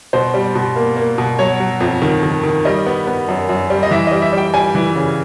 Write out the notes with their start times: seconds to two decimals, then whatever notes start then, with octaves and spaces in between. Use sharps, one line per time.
0.13 B2 C5
0.34 G3
0.55 B2
0.76 A#3
0.97 A#3
1.18 B2
1.39 F#3 C#5
1.60 F#3
1.80 F2
2.02 D#3
2.23 D#3
2.43 D#3
2.65 G3 D#5
2.86 B3
3.07 B3
3.28 F#2
3.49 F#2
3.70 G3
3.83 D#5
3.91 E3 E5
4.07 G3 D#5
4.22 E5
4.33 G3 G5
4.54 G3 G#5
4.75 E3
4.95 C#3